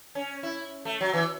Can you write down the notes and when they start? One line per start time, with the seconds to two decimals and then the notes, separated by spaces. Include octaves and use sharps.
0.15 C#4
0.43 E4
0.85 A3
1.01 F#3
1.13 E3